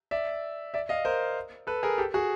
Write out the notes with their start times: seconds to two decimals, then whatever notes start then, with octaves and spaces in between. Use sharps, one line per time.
0.11 D5 E5
0.74 D5 E5
0.89 D#5 F5
1.05 A#4 C5
1.67 A4 B4
1.83 G#4 A#4
1.98 G4 A4
2.14 F#4 G#4